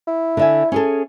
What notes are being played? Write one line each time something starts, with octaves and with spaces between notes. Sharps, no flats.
E4
D3 E5 G#5
C#4 G#4 A4